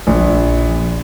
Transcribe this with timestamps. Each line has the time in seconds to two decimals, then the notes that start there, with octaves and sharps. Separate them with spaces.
0.07 A#1